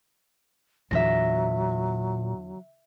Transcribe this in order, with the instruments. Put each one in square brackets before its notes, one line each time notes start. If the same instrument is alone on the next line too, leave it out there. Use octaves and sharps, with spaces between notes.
[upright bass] E2 D3 [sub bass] A#2 [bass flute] F#3 [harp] E5 A#6